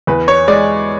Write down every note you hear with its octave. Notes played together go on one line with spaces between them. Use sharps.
E2 B4
C#5
G#3 D5